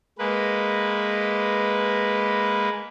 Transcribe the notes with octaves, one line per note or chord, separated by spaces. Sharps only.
G#3 A#3 B4